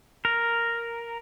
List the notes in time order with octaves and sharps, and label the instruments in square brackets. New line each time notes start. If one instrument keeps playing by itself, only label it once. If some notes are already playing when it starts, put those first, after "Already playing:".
[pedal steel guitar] A#4